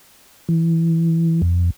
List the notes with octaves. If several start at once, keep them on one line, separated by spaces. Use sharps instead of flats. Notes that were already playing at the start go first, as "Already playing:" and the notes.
E3
F2